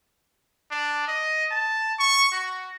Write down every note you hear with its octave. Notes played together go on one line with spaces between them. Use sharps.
D4
D#5
A5
C#6
F#4